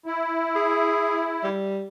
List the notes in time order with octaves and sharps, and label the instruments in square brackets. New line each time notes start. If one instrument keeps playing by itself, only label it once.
[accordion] E4
[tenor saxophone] G#4
G3